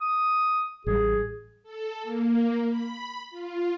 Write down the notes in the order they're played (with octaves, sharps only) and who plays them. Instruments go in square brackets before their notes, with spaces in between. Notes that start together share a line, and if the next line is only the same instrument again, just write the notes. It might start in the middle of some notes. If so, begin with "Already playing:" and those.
[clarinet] D#6
[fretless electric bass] A1 G3 [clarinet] G#4
[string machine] A4
A#3
B5
F4